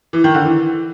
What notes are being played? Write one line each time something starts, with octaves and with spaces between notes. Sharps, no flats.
E3
D#3
D3
E3